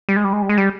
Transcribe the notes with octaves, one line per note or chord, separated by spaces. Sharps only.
G3
G#3
G3
G#3
G3
G#3
G3